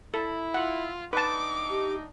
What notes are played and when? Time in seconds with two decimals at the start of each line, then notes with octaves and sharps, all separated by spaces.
0.14 E4 A4
0.54 F4 F#5
1.13 A2 D4 D#4 B4 A5 D6
1.70 G4